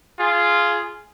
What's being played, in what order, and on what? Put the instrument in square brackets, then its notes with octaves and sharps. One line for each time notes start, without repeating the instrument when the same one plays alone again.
[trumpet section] F4 G#4